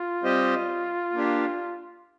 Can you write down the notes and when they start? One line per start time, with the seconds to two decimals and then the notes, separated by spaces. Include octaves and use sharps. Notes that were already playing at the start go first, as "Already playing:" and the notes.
Already playing: F4
0.23 G3 C4 G4 C5 D#5
1.13 A#3 D4 G4